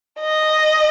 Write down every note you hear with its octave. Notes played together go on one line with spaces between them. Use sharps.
D#5